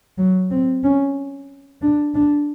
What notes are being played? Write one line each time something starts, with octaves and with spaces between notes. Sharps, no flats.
F#3
C4
C#4
D4
D4